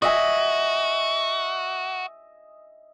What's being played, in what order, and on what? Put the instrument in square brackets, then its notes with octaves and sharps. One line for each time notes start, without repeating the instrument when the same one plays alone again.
[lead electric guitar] F#4 [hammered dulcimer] D#5 E5 G#5